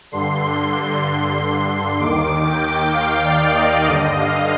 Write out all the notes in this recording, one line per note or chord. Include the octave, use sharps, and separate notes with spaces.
G2 D3 C6
D#2 D#3 D6
G5
F5
D5
D#5
G2 D3 D#5
F5